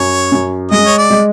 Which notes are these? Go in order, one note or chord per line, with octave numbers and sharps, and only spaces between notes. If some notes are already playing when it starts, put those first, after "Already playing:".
Already playing: F#2 C#5
F#2
G#3 D#5
C#5
D5
G#3